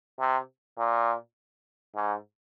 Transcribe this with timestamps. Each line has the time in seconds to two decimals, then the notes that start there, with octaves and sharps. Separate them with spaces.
0.19 C3
0.78 A#2
1.96 G#2